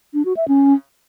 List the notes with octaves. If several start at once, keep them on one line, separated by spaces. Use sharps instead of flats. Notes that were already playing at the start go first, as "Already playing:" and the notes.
D4
F#4
E5
C#4